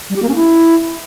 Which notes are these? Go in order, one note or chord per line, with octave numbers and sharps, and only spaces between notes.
G3
G4
A#3
C#4
E4